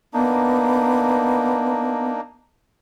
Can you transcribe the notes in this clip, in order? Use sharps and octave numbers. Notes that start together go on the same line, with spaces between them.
A#3 B3 D4 D#4